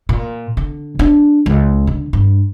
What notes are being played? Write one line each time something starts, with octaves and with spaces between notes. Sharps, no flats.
A#2
D3
D4
C#2
D3
G2